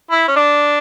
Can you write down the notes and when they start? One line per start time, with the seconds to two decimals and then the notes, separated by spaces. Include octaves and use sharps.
0.11 E4
0.28 C#4
0.36 D4